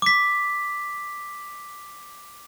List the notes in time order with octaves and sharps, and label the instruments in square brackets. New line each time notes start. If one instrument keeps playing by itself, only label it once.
[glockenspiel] D6 B6